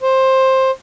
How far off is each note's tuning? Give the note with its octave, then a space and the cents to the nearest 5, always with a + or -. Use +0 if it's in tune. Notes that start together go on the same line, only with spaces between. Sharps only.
C5 +15